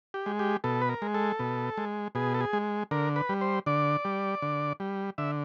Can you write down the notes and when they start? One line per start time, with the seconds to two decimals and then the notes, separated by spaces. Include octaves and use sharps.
0.14 G4
0.26 G#3
0.39 G4
0.64 B2 A4
0.82 B4
0.89 A#4
1.02 G#3
1.14 A4
1.39 B2
1.78 G#3
2.15 B2 G#4
2.34 A4
2.41 G#4
2.53 G#3
2.91 D3 A#4
3.16 B4
3.29 G3
3.41 C5
3.66 D3 D5
4.05 G3
4.42 D3
4.80 G3
5.18 D3 E5